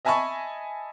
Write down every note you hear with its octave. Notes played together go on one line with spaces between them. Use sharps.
D#5 E5 G#5 A5 B5 C#6